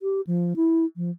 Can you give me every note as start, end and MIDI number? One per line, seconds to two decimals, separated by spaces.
0.01 0.21 67
0.27 0.54 53
0.56 0.85 64
0.97 1.11 53